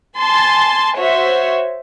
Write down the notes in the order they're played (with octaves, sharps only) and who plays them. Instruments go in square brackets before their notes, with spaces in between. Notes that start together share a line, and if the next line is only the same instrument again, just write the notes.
[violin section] G#5 A5 C6 A6
F#4 C5 C#5 E5